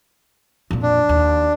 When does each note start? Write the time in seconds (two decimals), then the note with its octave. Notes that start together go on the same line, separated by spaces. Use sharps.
0.70 F2 A#2
0.83 D4
1.09 D#2